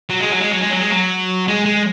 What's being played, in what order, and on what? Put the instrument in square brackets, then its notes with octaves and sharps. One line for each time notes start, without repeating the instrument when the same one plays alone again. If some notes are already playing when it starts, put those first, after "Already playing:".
[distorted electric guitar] F#3
G#3
F#3
G#3
F#3
G#3
F#3
G#3
F#3
G#3
G#3